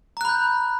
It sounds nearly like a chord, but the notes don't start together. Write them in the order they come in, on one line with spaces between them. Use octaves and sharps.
A#5 F#6 B5 G6